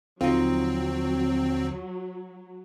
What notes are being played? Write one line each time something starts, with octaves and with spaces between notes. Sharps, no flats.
D#2 D3 F3 F#3 C4 D#4 F4